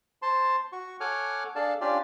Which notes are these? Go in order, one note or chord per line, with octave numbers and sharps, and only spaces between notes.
C5 A5 C6
F#4 C#6
A4 C#5 F#5 G#5 D6 F6
D4 G#4 A4 D5 F5 A5
C#4 D4 F4 G4 D5